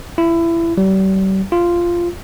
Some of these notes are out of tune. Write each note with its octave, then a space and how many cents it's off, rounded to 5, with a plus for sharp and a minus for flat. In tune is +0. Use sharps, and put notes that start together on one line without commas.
E4 +25
G3 -40
F4 -10